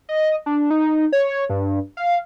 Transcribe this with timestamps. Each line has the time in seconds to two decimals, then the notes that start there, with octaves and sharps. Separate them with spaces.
0.09 D#5
0.46 D4
0.70 D#4
1.12 C#5
1.50 G2
1.97 F5